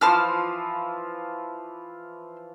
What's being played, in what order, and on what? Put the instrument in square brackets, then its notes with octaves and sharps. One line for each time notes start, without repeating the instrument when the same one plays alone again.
[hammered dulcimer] E3 F3 F4 [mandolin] C5 A5 F6